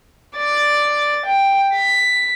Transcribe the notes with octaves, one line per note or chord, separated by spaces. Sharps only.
D5 A6
G5
B6